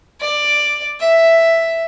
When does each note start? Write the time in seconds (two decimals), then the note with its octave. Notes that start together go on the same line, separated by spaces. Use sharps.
0.20 D5
1.00 E5